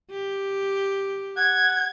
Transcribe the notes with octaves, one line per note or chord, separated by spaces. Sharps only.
G4
F#5 G#6